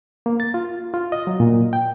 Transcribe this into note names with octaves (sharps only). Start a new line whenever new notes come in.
A#3
A6
F4
F4
D#5
F#3
A#2
G5